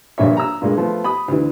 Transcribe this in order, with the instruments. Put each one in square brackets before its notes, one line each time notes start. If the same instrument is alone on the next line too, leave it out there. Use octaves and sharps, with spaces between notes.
[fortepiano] A#1 G2 A#2 C#5 E5
A#5 E6
G2 A#2 G#3
F3 A3 B3
B5 D#6
D2 E3